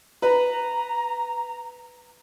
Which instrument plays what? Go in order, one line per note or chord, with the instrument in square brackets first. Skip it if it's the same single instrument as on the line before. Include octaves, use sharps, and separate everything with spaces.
[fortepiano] B4 [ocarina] A#5